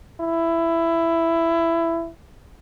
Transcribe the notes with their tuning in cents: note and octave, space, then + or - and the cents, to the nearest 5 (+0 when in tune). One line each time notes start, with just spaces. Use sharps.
E4 +15